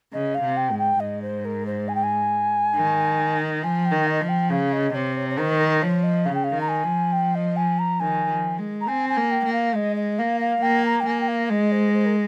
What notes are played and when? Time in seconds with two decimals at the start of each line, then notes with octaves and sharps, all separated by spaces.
0.13 C#3 D#5
0.35 F5
0.42 C3
0.57 G5
0.71 G#2
0.79 G5
1.00 G#2 D#5
1.22 C5
1.45 A#4
1.66 C5
1.88 G#5
1.95 G5
2.03 G#5
2.75 D#3
3.63 F3 G#5
3.85 G5
3.92 D#3
4.07 D#5
4.21 F3
4.29 G5
4.50 C#3 F5
4.73 D#5
4.94 C3 C#5
5.16 C#5
5.30 C#5
5.38 D#3 C5
5.59 A#4
5.82 F3 C#5
6.03 D#5
6.25 C#3 F5
6.35 G5
6.44 F5
6.55 D#3
6.61 A#5
6.68 G#5
6.84 F3
7.12 G5
7.35 D#5
7.56 G#5
7.79 A#5
8.00 D#3 G#5
8.29 F3
8.58 G#3
8.81 A#5
8.88 C4 G#5
9.09 G#5
9.17 A#3
9.31 G5
9.46 A#3
9.53 F5
9.75 G#3 D#5
9.96 D#5
10.18 A#3 F5
10.41 F5
10.62 A#3 G5
10.85 A#5
11.00 G5
11.06 A#3 G#5
11.20 G5
11.28 F5
11.49 G#3 D#5
11.72 C5
11.94 C5
12.06 A#4